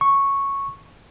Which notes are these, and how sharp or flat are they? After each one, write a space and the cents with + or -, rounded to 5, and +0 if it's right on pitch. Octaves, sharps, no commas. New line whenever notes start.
C#6 -5